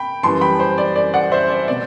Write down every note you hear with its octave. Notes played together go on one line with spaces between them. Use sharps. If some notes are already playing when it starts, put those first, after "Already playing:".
Already playing: G5 B5
F#2 E3 G3 A5 C6
G5 B5
C5
D5
D5
D5 F#5
C5 E5
D5
B2 D5